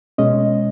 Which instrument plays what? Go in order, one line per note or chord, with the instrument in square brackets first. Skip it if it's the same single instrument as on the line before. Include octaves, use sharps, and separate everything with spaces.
[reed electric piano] B2 G#3 C#4 D#5